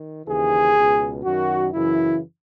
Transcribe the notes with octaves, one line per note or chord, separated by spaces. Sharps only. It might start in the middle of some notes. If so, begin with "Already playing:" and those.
Already playing: D#3
D#2 C#3 E3 G#4
C#2 B2
F#2 D#3 F#4
F#2 C#3 E3 E4